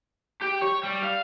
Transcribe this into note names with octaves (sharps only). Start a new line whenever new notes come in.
G4
C#5
G3
F5